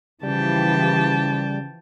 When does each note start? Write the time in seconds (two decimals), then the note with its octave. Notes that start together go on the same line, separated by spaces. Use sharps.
0.23 C#3 E3 F3 G3 G4 G5 A5